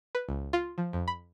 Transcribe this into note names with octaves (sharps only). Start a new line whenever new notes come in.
B4
C#2
F4
F3
F2
B5